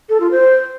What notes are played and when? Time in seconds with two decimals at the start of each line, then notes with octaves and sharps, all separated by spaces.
0.09 A4
0.20 F4
0.31 C5